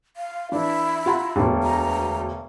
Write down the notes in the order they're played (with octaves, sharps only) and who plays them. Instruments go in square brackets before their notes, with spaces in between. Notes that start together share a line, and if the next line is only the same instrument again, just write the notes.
[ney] F5
[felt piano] E3 D4 [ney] E4
[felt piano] F4 F#5 A#5
E1 D2 B2
[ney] A#5